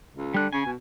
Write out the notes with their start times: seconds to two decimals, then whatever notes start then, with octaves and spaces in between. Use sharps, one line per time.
0.15 C#2
0.34 D3 G3 F#6
0.53 C#3 G#5
0.66 B2